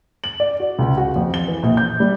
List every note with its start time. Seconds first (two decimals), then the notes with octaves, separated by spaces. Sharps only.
0.24 F#7
0.40 D5
0.60 F#4
0.79 C#2
0.98 F#4
1.16 F2
1.34 G7
1.48 E3
1.63 A#1
1.77 G6
2.00 G3